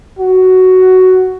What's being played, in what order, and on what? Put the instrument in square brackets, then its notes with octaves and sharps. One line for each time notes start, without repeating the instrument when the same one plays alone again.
[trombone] F#4